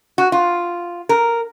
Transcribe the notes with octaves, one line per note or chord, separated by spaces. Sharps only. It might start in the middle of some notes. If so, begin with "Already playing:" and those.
F#4
F4
A#4